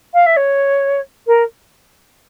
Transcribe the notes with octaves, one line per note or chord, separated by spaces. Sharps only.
F5
E5
C#5
A#4